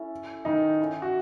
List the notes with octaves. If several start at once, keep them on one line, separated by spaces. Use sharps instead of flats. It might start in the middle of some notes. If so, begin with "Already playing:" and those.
Already playing: C#4 E4 A4
D#3 D#4
C#4 E4 A4
F#4